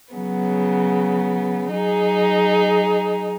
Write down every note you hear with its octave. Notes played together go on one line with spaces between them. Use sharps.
C#3 F#3 B3
F#3 D#4 G#4